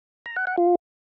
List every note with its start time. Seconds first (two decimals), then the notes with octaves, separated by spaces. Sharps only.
0.26 A#5
0.36 F#5
0.47 F#5
0.58 F4